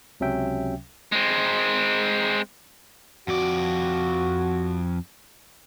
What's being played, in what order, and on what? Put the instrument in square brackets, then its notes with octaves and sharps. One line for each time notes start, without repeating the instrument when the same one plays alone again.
[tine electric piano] C#2 C3 F#3 C#4 E5 G5
[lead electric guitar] G#3 C4
[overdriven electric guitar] F2 D5 [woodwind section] F#4